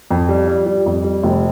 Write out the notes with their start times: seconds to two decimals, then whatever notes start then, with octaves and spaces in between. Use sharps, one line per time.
0.11 F2
0.29 G3
0.48 G3
0.66 G3
0.86 F2
1.04 G3
1.23 F1